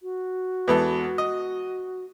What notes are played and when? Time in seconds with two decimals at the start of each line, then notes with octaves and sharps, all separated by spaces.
0.03 F#4
0.68 E2 G#3 B3 A4 B4
1.18 D#5